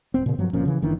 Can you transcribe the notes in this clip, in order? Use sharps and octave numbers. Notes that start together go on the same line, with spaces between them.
D1 C4
A#2 C#3
G2 F3 F#3
G1 A#2 F3 C#4
C#3 E3
F#1 D#3 E3 D4